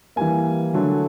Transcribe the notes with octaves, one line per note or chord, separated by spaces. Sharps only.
E3 G3 A#3 G#5
D3 F#3 A3